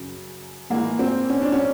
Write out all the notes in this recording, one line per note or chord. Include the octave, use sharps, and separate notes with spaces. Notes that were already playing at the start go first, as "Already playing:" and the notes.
Already playing: F#2 C#3 F#3
A2 E3 G#3 A#3
C4
C#4
D4
C#4